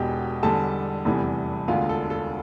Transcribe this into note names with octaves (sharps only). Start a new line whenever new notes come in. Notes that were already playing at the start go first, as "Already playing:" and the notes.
Already playing: E1 E2 B2 G4 G5
E2 D3 G3 A4 A5
F1 E2 C3 E3 G3
E1 D2 D3 F4 F5
A4
A4